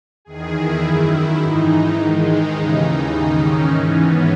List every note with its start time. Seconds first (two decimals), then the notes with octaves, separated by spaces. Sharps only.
0.25 E2 D#3 G#4
0.54 E4
0.82 F#2 D#3
1.11 E4
1.39 G#2 E3 D#4
1.96 G#2 D#3 G#3
2.24 D#4
2.53 D#2 C#3 E3
3.10 G#2 D#3
3.38 C#4
3.67 G#2 E3 C#4
3.95 B3